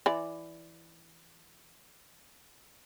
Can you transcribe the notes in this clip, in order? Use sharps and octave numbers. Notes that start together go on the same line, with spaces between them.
E3 D5